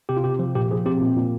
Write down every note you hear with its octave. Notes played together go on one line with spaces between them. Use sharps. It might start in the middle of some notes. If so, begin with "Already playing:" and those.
C3 G4
F4
C3 G4
F3
A#2 G4
F3 G#4
C4 G4
A#2
A#2